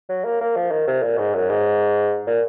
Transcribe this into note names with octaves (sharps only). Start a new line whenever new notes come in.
F#3
A#3
A#3
F3
D#3
C3
A#2
G#2
F#2
G#2
A#2